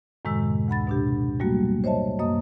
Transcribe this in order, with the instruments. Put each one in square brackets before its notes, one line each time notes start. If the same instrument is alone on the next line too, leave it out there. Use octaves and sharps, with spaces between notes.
[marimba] F#2 A2 C3 D#3 G#3 E6
D2 F#5 B5 A6
B2 D4 G4
F#3 G3 A3 A#3 F#4
C5 C#5 D#5 E5 A5
F#2 A#3 D#5 D#6